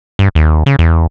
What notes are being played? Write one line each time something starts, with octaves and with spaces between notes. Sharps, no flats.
G2
D#2
C#3
E2